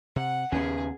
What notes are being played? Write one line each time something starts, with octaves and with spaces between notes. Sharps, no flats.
C3 F#5
D#2 C#3 B3 C#4 G#4